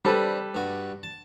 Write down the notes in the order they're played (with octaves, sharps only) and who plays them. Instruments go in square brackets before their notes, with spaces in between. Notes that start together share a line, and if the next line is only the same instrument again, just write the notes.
[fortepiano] G3 A4 B4 [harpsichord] C4 D4
[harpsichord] G2 F#4
A5